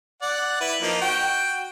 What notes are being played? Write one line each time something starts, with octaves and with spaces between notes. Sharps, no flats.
D5 F#5
E4 B4
F3 A#3 D#4
F#4 G5